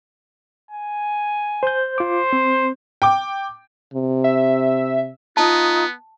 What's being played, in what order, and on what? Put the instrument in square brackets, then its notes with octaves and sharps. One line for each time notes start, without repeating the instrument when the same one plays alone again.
[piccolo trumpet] G#5
[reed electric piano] C5 G6
[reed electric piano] F4 D6 [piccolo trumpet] C5
[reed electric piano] C4
[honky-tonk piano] G5 D6
[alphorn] C3
[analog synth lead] E5
[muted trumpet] B3 [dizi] D#4 [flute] F4 [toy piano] A5